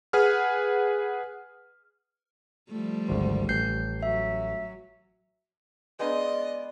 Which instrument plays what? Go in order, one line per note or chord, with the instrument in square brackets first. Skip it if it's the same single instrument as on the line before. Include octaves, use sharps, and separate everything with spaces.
[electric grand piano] G#4 B4 F#5 F6
[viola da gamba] F3 G3 A3
[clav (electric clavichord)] G#1 D2 C5
[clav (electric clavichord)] A1 [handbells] G6 C7
[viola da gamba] F#3 [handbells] E5
[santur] G#3 B3 F5 [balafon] D4 B4 [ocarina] D5 [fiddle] D#5